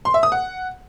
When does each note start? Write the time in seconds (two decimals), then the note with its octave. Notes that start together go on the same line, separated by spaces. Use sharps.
0.05 C6
0.14 E5
0.23 D#6
0.32 F#5